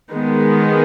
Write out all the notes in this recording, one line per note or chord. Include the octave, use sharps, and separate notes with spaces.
D#3 G#3 B3